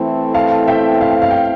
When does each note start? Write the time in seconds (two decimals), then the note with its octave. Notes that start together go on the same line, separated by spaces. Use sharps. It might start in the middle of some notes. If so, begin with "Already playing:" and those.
Already playing: E3 A3 C4 E4 A4
0.34 F5 A5
0.67 E5 G5
1.01 F5
1.11 G5
1.22 F5
1.31 G5